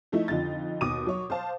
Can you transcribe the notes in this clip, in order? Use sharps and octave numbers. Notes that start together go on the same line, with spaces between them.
F3 A3 D#4 E4
F2 D3 D#4 F4 A6
D#2 B2 D6 D#6 D#7
F#3 C#5
C5 F5 A5